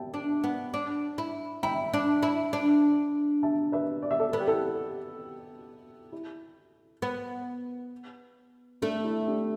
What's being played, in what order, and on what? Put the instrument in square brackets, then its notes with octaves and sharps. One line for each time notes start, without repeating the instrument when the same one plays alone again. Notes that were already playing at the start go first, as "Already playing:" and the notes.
Already playing: [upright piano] E5 G5 A5
[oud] D4
B3
D4
E4
[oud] E4 [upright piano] G5 B5
[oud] D4
E4
D4
[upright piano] E5 A5
B4 E5
D5
E5
A4 D5
[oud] B3 [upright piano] A4
[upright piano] G4
E4 A4
E4
[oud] B3
[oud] A3 [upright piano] D4
[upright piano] E4
D4 G4